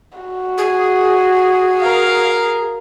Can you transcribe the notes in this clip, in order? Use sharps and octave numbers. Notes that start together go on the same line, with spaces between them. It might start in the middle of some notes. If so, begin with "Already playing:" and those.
F#4
G#4
A#4 F5